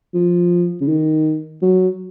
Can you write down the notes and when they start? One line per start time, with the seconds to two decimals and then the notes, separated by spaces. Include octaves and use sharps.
0.14 F3
0.81 C#3
0.89 D#3
1.62 F#3